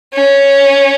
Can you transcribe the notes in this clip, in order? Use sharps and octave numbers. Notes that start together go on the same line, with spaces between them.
C#4